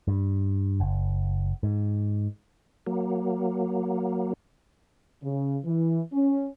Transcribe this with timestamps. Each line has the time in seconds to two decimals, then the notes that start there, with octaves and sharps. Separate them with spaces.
0.08 G2
0.80 F#1
1.63 G#2
2.87 F#3 A#3
5.23 C#3
5.64 E3
6.12 C#4